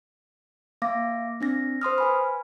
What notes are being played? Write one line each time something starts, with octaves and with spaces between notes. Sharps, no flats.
A#3 F5 D6 A#6
C4 D4 A#6
C5 C6 D#6 F6
B4 G#5 B5